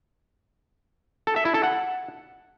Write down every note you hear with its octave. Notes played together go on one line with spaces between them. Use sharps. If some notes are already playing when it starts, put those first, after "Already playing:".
A4
E5
E4
A4
F#5